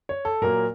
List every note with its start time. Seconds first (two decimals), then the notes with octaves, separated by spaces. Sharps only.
0.09 C#5
0.25 A4
0.42 A#2 F#3 A#3 A#4